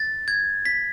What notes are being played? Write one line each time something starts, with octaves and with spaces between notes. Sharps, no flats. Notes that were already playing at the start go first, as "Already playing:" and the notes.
Already playing: A6
G#6
B6